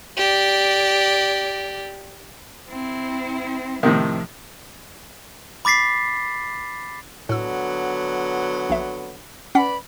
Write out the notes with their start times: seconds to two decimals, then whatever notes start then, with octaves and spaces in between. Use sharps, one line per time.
0.17 G4 D5
2.69 C4 E4
3.83 A2 C3 D#3 F3
5.65 B5 D6 A6 B6 C7
7.29 A2 D3 F#3 B3 E6
8.70 A#1 E5
9.55 C#4 B4 D5 F#5 B5 B6